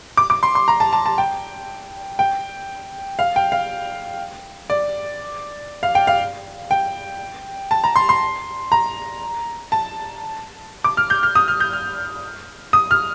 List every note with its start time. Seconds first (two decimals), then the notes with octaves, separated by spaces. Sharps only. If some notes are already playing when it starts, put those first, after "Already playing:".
0.17 D6
0.30 D6
0.43 C6
0.55 C6
0.68 A#5
0.80 A5
0.93 A5
1.06 A5
1.18 G5
2.19 G5
3.19 F5
3.36 G5
3.52 F5
4.70 D5
5.83 F5
5.95 G5
6.07 F5
6.71 G5
7.71 A5
7.84 A#5
7.96 C6
8.09 C6
8.72 A#5
9.72 A5
10.84 D6
10.97 F6
11.10 G6
11.23 F6
11.35 D#6
11.48 F6
11.60 G6
11.73 F6
12.73 D#6
12.91 F6